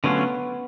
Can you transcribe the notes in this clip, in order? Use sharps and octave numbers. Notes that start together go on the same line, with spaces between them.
D3 F#3 A3 B3 C#4 F4